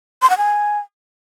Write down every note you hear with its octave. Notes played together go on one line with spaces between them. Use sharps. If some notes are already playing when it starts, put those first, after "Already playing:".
C6
F#5
G#5